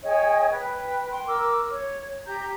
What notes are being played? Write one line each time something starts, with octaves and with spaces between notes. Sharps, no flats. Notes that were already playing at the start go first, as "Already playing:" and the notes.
G#4 C#5 D#5 G5
B4 G5
G5 C6
A#4 D6 E6
C#5
G4 A#5 G6